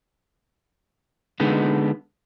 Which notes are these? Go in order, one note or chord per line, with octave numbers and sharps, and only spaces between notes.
D3 G#3 B3 D#4